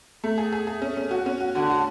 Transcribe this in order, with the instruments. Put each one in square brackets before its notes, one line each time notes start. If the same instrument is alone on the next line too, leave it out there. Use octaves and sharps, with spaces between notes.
[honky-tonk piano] A3
G#4
G#4
G#4
C#4
C#4
F#4
C#4
F#4
[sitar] D3 [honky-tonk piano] F#4
[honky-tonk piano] F#4